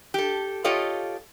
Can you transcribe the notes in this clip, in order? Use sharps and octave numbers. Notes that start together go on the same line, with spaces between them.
G4 A4
F4 G4 A4 C#5 D#5 F5